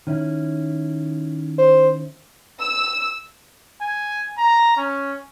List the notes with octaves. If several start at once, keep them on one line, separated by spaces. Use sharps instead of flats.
D#3 C#4 E4
C5
E6
G#5
A#5
C#4